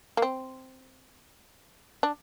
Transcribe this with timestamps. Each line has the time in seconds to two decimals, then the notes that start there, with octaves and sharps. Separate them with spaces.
0.17 A#3
0.22 C4
2.03 D4